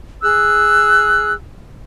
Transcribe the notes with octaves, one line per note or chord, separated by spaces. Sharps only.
G#4 E6 F#6